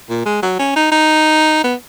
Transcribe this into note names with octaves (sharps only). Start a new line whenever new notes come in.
A#2
G#3
F#3
C#4
D#4
D#4
B3